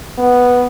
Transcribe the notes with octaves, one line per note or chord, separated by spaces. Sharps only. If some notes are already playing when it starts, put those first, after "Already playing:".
B3